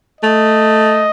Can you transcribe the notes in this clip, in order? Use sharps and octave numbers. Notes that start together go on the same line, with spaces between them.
A3 D#5